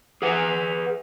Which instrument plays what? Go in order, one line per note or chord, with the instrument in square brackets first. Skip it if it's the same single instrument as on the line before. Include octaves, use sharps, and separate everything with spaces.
[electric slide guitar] G#4 B4 F#5